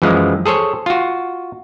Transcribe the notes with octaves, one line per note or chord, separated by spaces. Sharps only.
F#2 E3 F3 G#3
G#4 A4 C5 C#5
F4 F#4